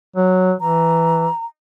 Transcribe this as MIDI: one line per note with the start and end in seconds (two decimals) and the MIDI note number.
0.16 0.53 54
0.61 1.27 52
0.61 1.45 82